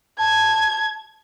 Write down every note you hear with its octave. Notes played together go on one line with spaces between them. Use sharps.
A5 G#6